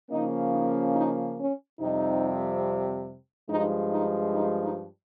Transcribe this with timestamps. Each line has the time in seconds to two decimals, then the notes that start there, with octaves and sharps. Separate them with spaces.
0.11 C#3 F3 A#3 C#4 D#4
0.53 D#4
0.96 D#4
1.38 C#4
1.80 F2 C3 G3 D#4
3.50 G2 F3 G#3 D#4
3.92 D#4
4.35 D#4
4.64 D#4